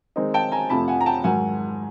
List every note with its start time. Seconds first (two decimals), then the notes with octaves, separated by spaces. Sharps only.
0.16 D#3 G#3 C4 D#4
0.34 G5 A5
0.52 G#5 A#5
0.70 F2 C3 F3 A3 A5 B5
0.88 F#5 G#5
1.01 A#5
1.06 G5 A5
1.24 G#2 D#3 F#3 F#5 G#5